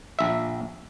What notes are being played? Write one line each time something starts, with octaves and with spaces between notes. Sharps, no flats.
A#1 E5